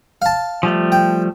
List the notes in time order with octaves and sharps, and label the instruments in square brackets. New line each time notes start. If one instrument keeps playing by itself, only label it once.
[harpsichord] F5 A5
[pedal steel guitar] F3 G3 A3
[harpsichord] G5